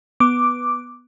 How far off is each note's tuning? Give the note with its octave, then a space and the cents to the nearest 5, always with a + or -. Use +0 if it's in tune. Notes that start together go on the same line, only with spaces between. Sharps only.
B3 +0 D6 +0